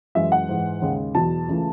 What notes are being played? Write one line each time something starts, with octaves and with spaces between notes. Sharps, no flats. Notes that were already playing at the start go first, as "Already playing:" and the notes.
F#2 E3 G#3 E5
F#5
G#2 E3 G#3
D#2 C#3 G#3
E2 B2 F#3 A5
C#2 C#3 E3 A3